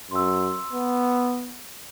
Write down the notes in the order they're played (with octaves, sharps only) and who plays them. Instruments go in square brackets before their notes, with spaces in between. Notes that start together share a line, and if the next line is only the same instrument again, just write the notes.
[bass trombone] F#2 [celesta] C6 E6
[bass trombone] B3